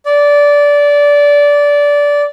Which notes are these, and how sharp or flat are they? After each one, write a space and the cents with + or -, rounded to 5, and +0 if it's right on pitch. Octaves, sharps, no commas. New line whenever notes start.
D5 -15